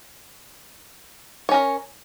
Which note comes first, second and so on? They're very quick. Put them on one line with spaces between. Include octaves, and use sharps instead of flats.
C#5 C#4 A#4